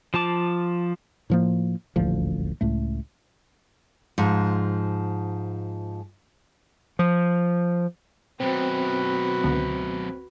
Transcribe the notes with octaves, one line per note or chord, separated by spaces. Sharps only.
F3 F4 A5 D6
A2 F3 A#3
D#1 A1 D2 F3
C#2 A2 A3
G#2 F3
F3
F#2 B2 C4 F#4 B4
C#2 D3 B3